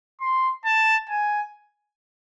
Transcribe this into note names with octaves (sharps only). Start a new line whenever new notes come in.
C6
A5
G#5